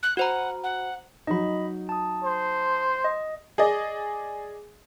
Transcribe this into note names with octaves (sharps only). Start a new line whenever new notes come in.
F#6
F#4 C5 F#5 A#5
F#5
F#3 D#4 D#5 B5
A5 D#6
C5
D#5
G#4 D5 D#5